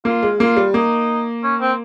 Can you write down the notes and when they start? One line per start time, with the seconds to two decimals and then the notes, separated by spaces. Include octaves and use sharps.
0.05 A#3 F4
0.23 G#3
0.40 A#3 F4
0.57 G3
0.74 A#3 D#4
1.43 C#4
1.61 C4